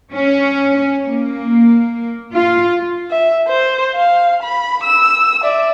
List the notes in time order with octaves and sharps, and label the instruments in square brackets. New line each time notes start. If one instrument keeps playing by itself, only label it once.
[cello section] C#4
A#3
F4
[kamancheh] E5
C5
F5
B5
E6
D5 E5